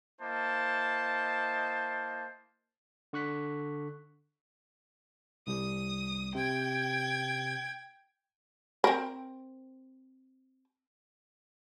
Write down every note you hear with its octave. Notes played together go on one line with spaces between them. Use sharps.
A#3 E4 C5 D#5 A5
D3 C#6 F#6 B6
C2 G3 D#6
C3 G5 G#6
C4 A#4